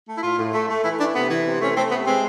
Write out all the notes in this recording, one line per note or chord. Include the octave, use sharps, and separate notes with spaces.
A3
E4
A2 F4
A2
A3
A3
E3 E4
A3 D4
C3 B3
E3
C3
A3 C#4
A3 C4
C3 B3
G#3 C4